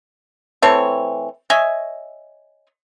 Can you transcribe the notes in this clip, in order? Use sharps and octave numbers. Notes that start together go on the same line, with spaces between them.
E3 A3 C4 C#5
C#5 D#5 E5 G#5